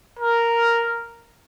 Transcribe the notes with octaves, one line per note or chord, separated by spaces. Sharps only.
A#4